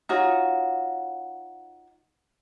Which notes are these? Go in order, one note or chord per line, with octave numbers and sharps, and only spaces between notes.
D#4 F4 F#4 C#5